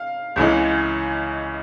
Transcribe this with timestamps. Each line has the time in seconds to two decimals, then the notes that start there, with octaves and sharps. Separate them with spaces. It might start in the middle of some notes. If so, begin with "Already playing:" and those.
Already playing: F5
0.36 C#2 C#3 E3 G#3